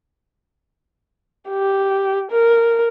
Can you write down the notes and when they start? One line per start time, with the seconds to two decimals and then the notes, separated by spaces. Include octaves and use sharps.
1.49 G4
2.31 A#4